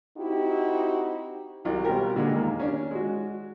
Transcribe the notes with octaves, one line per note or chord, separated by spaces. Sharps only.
C4 D#4 E4 F#4 G4
C2 F#3
B2 G3 C4 F4 G4 A#4
A#2 D3 G#3
D#2 A#3
C#4 D4
G#3 F#4